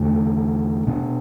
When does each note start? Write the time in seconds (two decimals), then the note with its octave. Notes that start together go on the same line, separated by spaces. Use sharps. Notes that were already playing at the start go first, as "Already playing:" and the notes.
Already playing: E2 D3 A3
0.87 B2 B3 D4